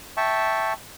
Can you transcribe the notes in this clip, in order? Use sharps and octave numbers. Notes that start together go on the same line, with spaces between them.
E5 G5 A5 C#6